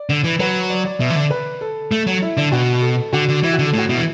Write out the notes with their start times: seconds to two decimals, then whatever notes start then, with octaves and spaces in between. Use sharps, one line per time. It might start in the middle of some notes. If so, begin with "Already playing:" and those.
Already playing: D5
0.10 D3
0.24 E3
0.40 F#3 B4
0.70 D5
0.85 D5
1.00 B2 E5
1.10 E3
1.15 D3 D5
1.30 B4
1.61 A4
1.91 A3
2.07 F#3
2.22 E4
2.37 D3 D4
2.52 B2 F#4
2.82 A4
3.13 D3 F#4
3.29 D3
3.43 E3 E4
3.53 F#4
3.59 D3
3.67 A4
3.74 A2 F#4
3.89 B2 E4
3.98 E3